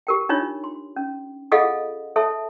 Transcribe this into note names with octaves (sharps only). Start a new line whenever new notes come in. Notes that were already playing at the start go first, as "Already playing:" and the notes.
G4 A#4 G5
D4 D#4 F4 C#5
C6
C#4
F4 G#4 A4 D#5 F5 F#5
A4 C#5 E5 A5